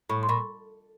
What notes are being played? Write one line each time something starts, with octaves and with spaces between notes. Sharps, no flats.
A2 B5 C#6
C6
A#2 B5 C#6